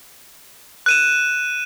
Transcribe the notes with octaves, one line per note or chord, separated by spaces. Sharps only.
F#6 D#7 E7